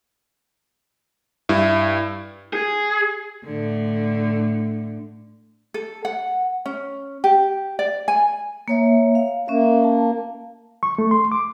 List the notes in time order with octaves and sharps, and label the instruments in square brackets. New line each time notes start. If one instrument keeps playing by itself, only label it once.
[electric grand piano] G2 E4
[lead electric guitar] G#4
[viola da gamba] A2 D3
[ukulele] A4
F#5
C#4
G4
D5
G#5
[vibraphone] A#3 C#5 E5
F5
[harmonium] A#3 [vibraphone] C#4 E5
[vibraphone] A5
[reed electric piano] C#6
A3
C6
D6